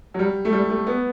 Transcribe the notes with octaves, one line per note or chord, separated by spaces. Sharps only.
F#3
G3
A3
G3
A3
B3